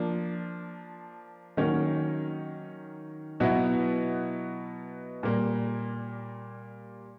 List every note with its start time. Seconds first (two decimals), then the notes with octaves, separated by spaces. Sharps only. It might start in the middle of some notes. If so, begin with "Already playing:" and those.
Already playing: F3 A#3 D4
1.57 D#3 F#3 A#3 C#4
3.40 B2 F#3 B3 E4
5.23 A#2 G3 A#3